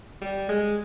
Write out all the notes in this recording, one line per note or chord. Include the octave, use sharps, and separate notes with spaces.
G3
G#3